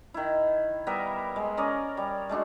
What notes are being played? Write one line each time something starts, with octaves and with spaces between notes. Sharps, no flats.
D#3 E4
G3 B3 A#4 E5
G#3
C#4 A#4 D5 D#5
G3
G#3 A3 D4 F#4